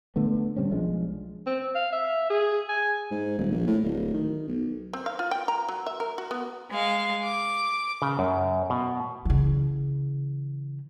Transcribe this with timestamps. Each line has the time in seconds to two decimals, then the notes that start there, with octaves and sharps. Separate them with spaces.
0.16 D3 A3 B3
0.56 D3 G3 C4 C#4
0.71 B1 F3 G#3 D4
1.46 C4
1.75 F5
1.92 E5
2.30 G#4
2.69 G#5
3.11 G#2
3.38 D#1
3.51 A#1
3.67 A2
3.83 D1
4.13 D#3
4.47 B1
4.93 C4
5.06 F5
5.19 F4
5.31 G5
5.48 A#5
5.69 F#3
5.87 E5
6.00 A#4
6.18 F#4
6.31 B3
6.70 G#3 F5
7.23 D6
8.02 C#3
8.19 F#2
8.70 B2
9.25 C#3 E3